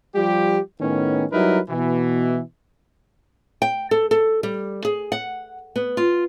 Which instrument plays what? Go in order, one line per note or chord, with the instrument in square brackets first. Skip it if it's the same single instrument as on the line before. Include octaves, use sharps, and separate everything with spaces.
[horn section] F3 G3 F4 G4
A2 D#3 B3 C#4
F#3 G3 D#4 E4 A#4 B4
B2 E3
[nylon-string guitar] G5
A4
A4
G3
G#4
F#5
B3
F4